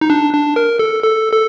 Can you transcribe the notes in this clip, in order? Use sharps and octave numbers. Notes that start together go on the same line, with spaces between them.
D#4
D4
D4
A#4
A4
A4
A4